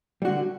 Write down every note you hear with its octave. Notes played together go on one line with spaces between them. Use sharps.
D3 G3 F#4